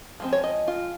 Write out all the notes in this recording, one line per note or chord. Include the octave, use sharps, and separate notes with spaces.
F3 G#3 C4
C#5
D#5
F4